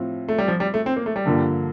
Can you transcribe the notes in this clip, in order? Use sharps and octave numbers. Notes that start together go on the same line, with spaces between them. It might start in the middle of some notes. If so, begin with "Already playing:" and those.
Already playing: A2 F3 C4 F4
A3
G3
F3
G3
A3
C4
A#3
A3
G3
G2 D3 F3 A#3